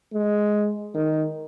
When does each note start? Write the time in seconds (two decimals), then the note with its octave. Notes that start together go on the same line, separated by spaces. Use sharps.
0.13 G#3
0.94 D#3